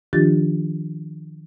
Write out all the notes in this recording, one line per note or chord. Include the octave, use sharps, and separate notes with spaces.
D#3 F3 D4 F4 G4 A6